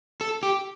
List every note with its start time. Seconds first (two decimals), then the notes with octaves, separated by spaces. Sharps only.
0.21 A4
0.43 G4